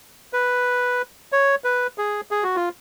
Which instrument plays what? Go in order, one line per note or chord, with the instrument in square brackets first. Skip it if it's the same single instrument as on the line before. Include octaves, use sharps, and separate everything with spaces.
[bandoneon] B4
C#5
B4
G#4
G#4
F#4
F4